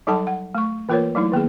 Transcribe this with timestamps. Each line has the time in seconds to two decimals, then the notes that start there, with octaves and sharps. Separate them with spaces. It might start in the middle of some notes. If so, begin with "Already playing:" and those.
0.07 F#3 G3 D#4 A4 F#5 A5
0.27 F#5
0.55 A3 C#6
0.89 E3 A#3 F4 A#4 C5 C#5
1.15 F#3 A3 D#4 E4
1.32 D#3 A#3 B3 G#4